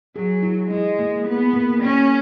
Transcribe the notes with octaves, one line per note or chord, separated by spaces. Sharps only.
F#3 G#4
E4
G#3 E4
A#3
B3 G#4
A#3
A#3 C#4